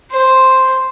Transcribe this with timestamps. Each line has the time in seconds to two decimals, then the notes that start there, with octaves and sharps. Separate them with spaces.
0.11 C5